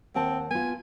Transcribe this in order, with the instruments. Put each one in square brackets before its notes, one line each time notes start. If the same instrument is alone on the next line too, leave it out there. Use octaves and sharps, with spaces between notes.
[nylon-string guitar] D#2 F#5 A5 [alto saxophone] C4
[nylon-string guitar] B3 F4 [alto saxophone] G#5